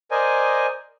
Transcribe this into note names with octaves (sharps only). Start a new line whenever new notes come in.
A#4 C5 D5 D#5 G#5